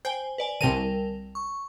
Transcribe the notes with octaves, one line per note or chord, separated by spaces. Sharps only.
C5 G5 G#5
B4 D5 G#5
C2 D3 A#4 G5 D#7
C#6